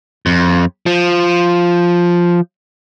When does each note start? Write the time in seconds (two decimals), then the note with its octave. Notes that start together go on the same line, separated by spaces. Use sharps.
0.26 F2
0.86 F3